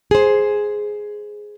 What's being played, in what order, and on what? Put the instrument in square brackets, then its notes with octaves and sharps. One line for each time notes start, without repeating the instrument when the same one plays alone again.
[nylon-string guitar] G#4 C5